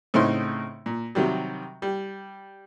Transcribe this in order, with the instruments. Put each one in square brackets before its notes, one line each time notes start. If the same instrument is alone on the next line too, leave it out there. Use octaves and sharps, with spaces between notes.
[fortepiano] A2 C#3 C4 D#4 C6
A#2
C3 D#3 F#3 G3
G3